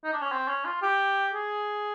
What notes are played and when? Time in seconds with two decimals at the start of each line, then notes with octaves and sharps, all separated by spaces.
0.04 D#4
0.13 D4
0.22 C#4
0.32 C4
0.48 C#4
0.65 F4
0.82 G4
1.33 G#4